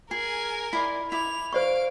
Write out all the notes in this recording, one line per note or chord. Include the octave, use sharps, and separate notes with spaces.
G#4 A#4 G#5
E4 D5 C6
E4 D6 F7
C5 D5 F5 C#6 D7